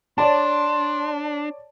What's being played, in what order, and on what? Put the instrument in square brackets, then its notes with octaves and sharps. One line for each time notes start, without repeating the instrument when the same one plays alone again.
[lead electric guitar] D4 [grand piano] C#5 D5 A5 [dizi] C6